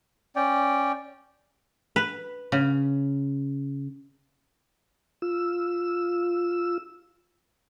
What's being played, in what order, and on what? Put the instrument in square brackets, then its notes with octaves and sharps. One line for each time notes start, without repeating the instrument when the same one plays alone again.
[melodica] C#4 D5 G5
[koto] B4
C#3
[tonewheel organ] F4 E6